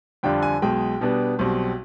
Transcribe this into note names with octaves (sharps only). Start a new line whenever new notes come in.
F2 D3 G3 D4 F4 G5
G#5
B1 B2 G#3 G5
B2 G3 B3 D4
B1 B2 G3 C4